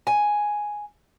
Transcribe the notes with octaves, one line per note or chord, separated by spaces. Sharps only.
G#5